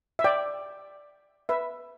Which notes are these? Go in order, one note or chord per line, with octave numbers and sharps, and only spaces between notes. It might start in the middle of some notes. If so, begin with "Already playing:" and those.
E5
D5 G5
B4 E5